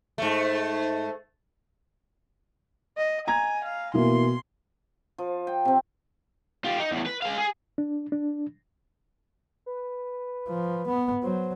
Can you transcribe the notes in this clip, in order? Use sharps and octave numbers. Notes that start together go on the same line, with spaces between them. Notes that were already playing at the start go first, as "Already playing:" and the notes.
G#2 A3
D#5
G#5 A#5 G#6
F5
B2 E3 A#3 C6
F3
G5
C3 C4
F4 G4
D#4
E2 A2
B4
G#3 F5
G#4
D4
D4
B4
F3
B3
F#3 C5